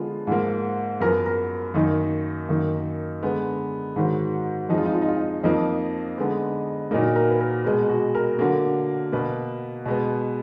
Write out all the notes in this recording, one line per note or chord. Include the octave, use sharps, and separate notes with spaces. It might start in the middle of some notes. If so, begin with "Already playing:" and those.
Already playing: D3 F3 G#3 B3 F4
G#2 F3 A#3
F#2 F3 B3 A#4
A#4
F#2 D#3 A#3 D#4
F#2 D#3 A#3
D3 G#3 B3
G#2 D#3 F#3
F2 F3 G#3 D#4
F4
D#4
F4
D#4
F4
D#4
F2 F3 A#3 D#4
D3 G#3 B3
A#2 F#3 A#3 D#4
A#4
B4
A#4
B2 G#3 B3 G#4
F#4
A#4
D3 F#3 A#3
B2 A#3 B4
B2 G#3 B3